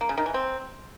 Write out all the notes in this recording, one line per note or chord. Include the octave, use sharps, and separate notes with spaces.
A#3
C#3
D#3
E3
C4